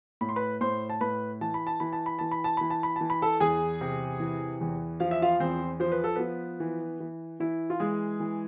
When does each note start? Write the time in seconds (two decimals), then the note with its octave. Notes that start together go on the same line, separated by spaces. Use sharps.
0.21 A2 B5
0.29 C6
0.36 B4 B5
0.61 A2 C5 C6
0.90 A5
1.01 A2 B4 B5
1.41 E3 A5
1.54 B5
1.67 A5
1.80 E3 B5
1.93 A5
2.06 B5
2.19 E3 A5
2.31 B5
2.44 A5
2.57 E3 B5
2.70 A5
2.83 B5
2.96 E3 A5
3.10 B5
3.22 A4 A5
3.40 E2 G#4 G#5
3.81 C3
4.20 E3
4.61 E2
5.00 F3 F5
5.11 E5
5.22 F4 F5
5.40 E2 C4 C5
5.80 F3 C5
5.92 B4
6.04 A4
6.16 F3 B3 B4
6.60 E3
7.00 E3
7.40 E3 E4
7.70 F4
7.80 E3 G#3 G#4
8.20 E3